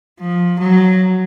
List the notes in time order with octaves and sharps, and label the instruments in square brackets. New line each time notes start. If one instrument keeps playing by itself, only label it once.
[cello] F3
F#3